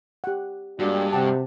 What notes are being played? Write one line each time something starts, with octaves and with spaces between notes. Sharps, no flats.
G4 F#5
G2 G#3 A#3 D4 F#4 G4
C3 F#5 G5 A5